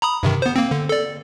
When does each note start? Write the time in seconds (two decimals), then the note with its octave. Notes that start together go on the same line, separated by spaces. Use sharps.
0.02 A#5 B5 D#6
0.23 G2 C3 D#3
0.42 B3 C5
0.56 A#3 C4
0.71 D3
0.89 A4 D5